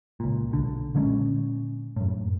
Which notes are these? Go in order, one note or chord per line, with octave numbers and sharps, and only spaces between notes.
C#2 A#2
B1 D3
A#2 D3 G#3 C#4
F#2 A2